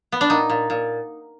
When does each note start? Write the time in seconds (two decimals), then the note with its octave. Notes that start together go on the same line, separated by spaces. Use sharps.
0.12 B3
0.21 D4
0.30 A#2 D#4
0.50 A#2
0.70 A#2